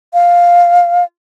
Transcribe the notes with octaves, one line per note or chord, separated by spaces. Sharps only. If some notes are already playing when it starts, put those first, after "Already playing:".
F5